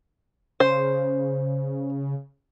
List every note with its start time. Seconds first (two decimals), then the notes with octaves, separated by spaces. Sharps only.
0.60 C#3 C5